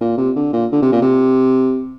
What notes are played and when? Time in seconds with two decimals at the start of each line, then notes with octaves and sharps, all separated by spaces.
0.01 A#2
0.18 C3
0.36 D3
0.53 A#2
0.72 D3
0.82 C3
0.92 A#2
1.02 C3